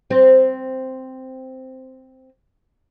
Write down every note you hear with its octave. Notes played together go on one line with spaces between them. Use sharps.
C4 C5